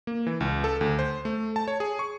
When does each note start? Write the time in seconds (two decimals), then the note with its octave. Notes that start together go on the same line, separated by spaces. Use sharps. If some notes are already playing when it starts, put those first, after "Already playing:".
0.07 A#3
0.27 E3
0.40 C#2
0.64 A4
0.81 D2
0.99 C5
1.25 A3
1.56 A5
1.68 C#5
1.80 G#4
1.99 C#6